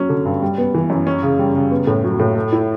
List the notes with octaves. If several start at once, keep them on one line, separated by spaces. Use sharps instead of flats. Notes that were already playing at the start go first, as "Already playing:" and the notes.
Already playing: F#3 C#4
D3
G2
G3
B3
E3
F#2
C#4
C#3
G3
C#3
B3
A2
F#3
A2
A3
E4